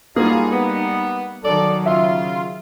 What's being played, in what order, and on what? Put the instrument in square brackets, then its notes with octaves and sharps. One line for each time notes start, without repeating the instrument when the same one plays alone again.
[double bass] G3 D#4 [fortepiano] A#3 [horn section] F4 F#4 G#4
[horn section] B3
[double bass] D#3 F#3 [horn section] A4 D5
[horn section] C#3 F4 [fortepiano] E5